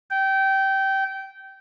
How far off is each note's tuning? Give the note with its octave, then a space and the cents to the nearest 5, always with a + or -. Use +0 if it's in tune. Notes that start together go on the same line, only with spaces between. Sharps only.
G5 -20